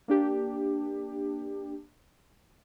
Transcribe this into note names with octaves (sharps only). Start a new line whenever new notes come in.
A#3 D4 G4